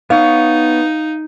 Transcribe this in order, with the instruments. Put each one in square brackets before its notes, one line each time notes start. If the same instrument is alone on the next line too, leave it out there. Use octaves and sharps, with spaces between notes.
[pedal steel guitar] B3 C#5 [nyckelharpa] D#4 [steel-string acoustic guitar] F5